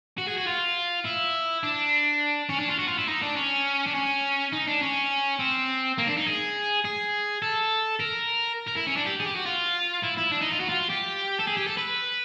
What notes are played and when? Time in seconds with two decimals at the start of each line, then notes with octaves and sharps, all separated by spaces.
0.18 F#4
0.28 G#4
0.38 F#4
0.47 F4
1.05 E4
1.63 D4
2.49 C#4
2.59 D4
2.69 F4
2.78 F#4
2.88 F4
2.98 E4
3.08 D#4
3.22 D4
3.36 C#4
3.87 D4
3.94 C#4
4.52 D#4
4.67 D4
4.82 C#4
5.39 C4
5.98 A#3
6.07 D4
6.17 D#4
6.27 G#4
6.85 G#4
7.42 A4
8.00 A#4
8.68 A#4
8.77 E4
8.87 C#4
8.97 D4
9.06 G4
9.20 G#4
9.26 G4
9.36 F#4
9.46 F4
10.03 E4
10.18 E4
10.32 D4
10.42 D#4
10.52 F4
10.60 F#4
10.69 F4
10.90 G4
11.40 A4
11.48 G#4
11.57 G4
11.67 A4
11.77 B4